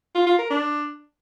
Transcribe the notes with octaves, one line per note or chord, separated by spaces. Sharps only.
F4
F4
A#4
D4